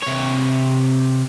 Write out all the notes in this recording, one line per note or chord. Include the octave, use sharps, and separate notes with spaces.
C3 C#5